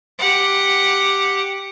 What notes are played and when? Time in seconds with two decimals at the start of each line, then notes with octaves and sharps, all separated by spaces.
0.19 G4 F#5